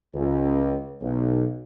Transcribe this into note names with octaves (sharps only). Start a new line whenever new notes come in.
C#2
B1